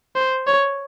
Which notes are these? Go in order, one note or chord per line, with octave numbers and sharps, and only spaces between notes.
C5
C#5